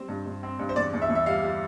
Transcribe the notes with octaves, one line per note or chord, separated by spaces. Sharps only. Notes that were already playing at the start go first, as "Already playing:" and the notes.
Already playing: G3 C4 C5
G2
G2
C4
G2
C5
E2 D5
E2
E5
E2
E5
G3 F5
G3